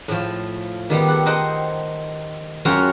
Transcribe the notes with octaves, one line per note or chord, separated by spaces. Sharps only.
A2 F3
D#3 G3 B3
A4 F#5
D#4 C5 D#5 F#5 G5
F#2 F4 F#4 C#5 F5 G5